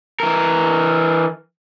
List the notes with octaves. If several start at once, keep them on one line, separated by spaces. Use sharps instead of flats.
E3 A#4